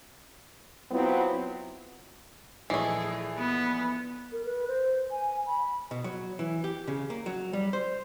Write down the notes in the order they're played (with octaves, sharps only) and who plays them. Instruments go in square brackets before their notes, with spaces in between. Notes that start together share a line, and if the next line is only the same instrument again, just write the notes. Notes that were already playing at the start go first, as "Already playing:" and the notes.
[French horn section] F#3 B3 C4 E4 F4
[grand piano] A#1 D#5 C7 [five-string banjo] E3 A3 [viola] G#4
[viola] B3
[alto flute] A#4
B4
C5
G#5
B5
[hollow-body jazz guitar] B2
F#3
E3
G4
C#3
A#3
F#3
G3
C5